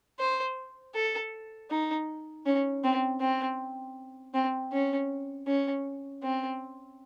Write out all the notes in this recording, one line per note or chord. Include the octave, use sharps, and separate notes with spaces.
C5
A4
D#4
C#4
C4
C4
C4
C#4
C#4
C4